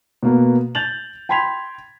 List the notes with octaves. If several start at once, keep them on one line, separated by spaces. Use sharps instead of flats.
B2 A#3 B3
G6 A6 F7 F#7
G5 B5 C6 G#6 B6 F7